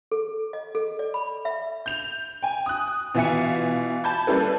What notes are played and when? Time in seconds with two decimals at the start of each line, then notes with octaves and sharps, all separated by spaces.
0.12 A4
0.53 D#5
0.75 A4
0.99 D5
1.14 B5
1.45 E5
1.86 G6 F7
2.42 G5 G#5
2.66 D#6 F#6
3.14 B2 E3 F4 E5 G#5 C#7
4.04 A5 B5 G6 G#6
4.27 G3 A#3 C#4 E4 A4 B4